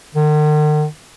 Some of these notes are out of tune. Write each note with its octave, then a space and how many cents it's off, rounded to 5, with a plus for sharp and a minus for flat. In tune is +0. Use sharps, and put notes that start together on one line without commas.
D#3 -45